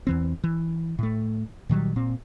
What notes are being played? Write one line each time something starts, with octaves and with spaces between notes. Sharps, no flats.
E2 E3 C4
E3
A2 A3
A#2 D#3 F#3 G3
A#2 C4